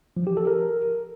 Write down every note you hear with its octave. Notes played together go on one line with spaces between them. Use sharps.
F3
G4
A4
A#4